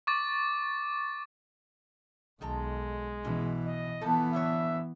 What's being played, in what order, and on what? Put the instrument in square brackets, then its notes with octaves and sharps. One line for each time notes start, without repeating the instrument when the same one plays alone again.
[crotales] C#6 D6 A6
[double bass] B1 [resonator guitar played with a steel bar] D#3 A4 A#5 [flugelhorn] G#3
[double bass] B2 E3 [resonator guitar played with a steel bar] C#4 E4
[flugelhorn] D#5
[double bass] E3 B3 [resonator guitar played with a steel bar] F3 A4
[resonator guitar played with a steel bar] A2 D3 C#5 [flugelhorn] E5